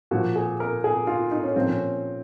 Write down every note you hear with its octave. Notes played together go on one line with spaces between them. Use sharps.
A#2 F3 F#4
G#4
A#4
G#4
F4
D#4
C#4
A#2 F3 C4
C#4